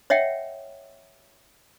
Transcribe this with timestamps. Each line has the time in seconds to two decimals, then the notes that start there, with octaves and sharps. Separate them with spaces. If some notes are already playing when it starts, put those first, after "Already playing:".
0.10 C#5 D#5 E5 F#5 G5